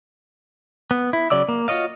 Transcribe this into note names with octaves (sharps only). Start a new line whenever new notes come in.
B3
E4
C#3 F#3 D5 D6 E6
A#3
F4 F#4 C#5 D#5 F5